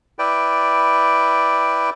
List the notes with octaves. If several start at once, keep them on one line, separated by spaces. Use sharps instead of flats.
E4 B4 D5 G5